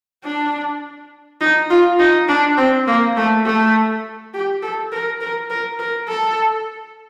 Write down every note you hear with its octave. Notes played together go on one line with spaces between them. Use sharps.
D4
D#4
F4
D#4
D4
C4
A#3
A3
A3
G4
A4
A#4
A#4
A#4
A#4
A4